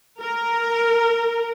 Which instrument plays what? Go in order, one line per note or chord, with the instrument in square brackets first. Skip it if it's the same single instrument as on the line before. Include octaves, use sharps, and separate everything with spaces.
[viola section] A#4